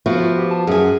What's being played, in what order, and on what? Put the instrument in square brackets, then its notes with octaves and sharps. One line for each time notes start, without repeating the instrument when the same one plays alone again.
[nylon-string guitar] F3 B3 F#4 [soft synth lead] E5
[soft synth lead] F4
G4
A5
[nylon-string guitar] F#2 G#5 [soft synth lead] G#4